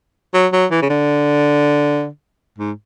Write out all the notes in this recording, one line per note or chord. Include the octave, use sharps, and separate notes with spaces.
F#3
F#3
E3
C#3
D3
G#2